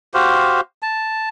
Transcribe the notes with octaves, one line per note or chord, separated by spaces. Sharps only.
F#4 G4 C5 F5
A5